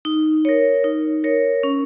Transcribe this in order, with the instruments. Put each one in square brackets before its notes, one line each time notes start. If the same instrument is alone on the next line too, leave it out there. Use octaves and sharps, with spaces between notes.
[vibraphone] D#4
A#4 C#5
D#4
A#4 C#5
C#4